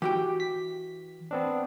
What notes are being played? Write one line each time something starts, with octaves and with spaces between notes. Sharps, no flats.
E3 F#4 G4 G5
B6
B3 C4 D4